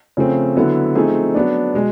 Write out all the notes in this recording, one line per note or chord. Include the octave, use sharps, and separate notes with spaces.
C#3 F3 A3 C4
D3 F#3 B3 E4
F3 A3 C4 D#4 G#4
F#3 B3 D4
B2 G#3